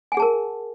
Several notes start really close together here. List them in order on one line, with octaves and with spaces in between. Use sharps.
G#5 F#5 G#4 A5 A#4